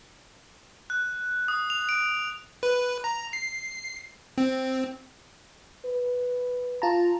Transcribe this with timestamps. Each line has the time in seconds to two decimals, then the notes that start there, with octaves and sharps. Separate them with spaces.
0.90 F#6
1.48 D#6
1.70 F7
1.89 D7
2.63 B4
3.04 A#5
3.33 C7
4.38 C4
5.85 B4
6.82 F4 A5 A#5